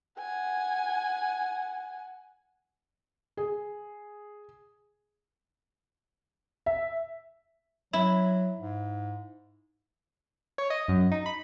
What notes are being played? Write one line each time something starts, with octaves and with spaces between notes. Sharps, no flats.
F#5 G#5
G#4
E5
F#3 E4
G#2
C#5
D#5
F#2
D#4
B5